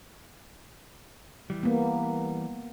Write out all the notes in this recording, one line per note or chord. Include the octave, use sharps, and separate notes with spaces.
E3 G3
A#3 B3